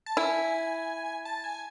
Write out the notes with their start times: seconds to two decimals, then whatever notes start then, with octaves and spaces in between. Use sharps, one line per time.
0.06 A5
0.17 E4 G#5
1.25 A5
1.44 G#5